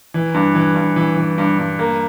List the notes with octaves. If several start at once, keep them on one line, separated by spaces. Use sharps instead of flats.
E3
G2
E3
G2
E3
E3
G2
G2
A#3